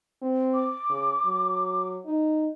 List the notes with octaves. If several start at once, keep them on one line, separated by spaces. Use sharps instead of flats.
C4
D6
C#3
F#3
D#4